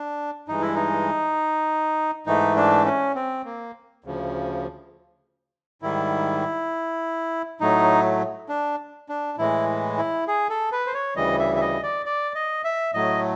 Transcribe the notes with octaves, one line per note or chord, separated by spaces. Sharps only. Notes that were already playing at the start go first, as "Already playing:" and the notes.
Already playing: D4
G2 E3 G#3 D#4
E4
D#4
G#2 E3 A3 D#4
D4
C#4
C4
A#3
D2 C#3 F3
G#2 D#3 G3 E4
A2 F#3 A3 D#4
D4
D4
A2 E3 G#3 E4
E4
G#4
A4
B4
C5
C#5
D2 C#3 E3 G3 D#5
E5
E5
D#5
D5
D5
D#5
E5
A2 F#3 A3 D#5